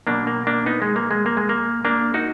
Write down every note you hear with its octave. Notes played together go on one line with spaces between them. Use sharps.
B2 F#3 A#3 D4
A#3
A#3 D4
B3 D#4
G#3
A#3
G#3
A#3
G#3
A#3
A#3 D4
D#4 F#4